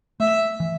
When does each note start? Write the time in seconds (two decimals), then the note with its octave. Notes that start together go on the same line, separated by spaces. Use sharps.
0.20 A3 E5
0.60 E3